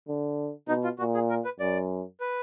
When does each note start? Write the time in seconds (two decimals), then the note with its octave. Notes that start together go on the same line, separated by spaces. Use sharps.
0.08 D3
0.68 B2 D#4
0.84 F4
0.99 A#2 F#4
1.15 G#4
1.29 A#4
1.45 B4
1.60 F#2 D5
2.20 B4